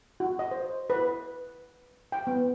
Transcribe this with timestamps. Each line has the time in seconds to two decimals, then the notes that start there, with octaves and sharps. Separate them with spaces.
0.20 F#4
0.39 D#5
0.51 C5
0.90 B4
2.12 G5
2.27 B3